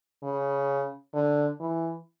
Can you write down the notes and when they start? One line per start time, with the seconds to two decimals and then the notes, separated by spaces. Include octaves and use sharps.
0.23 C#3
1.14 D3
1.60 E3